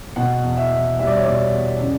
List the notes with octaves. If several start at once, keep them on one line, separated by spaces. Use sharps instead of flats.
B2 F#5
E2
E5
E2
G3 E5
D5
C#5
B2 D5
E2
C#3